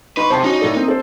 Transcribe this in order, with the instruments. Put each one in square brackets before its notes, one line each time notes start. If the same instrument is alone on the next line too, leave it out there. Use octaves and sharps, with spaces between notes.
[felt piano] D#4 C6 C#6 [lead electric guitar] B4
[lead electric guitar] C3 [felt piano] C5 A5 C6
[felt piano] C#4 F#4 [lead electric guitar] D#4
[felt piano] A2 A4 D5
A#3 C4
A4 C5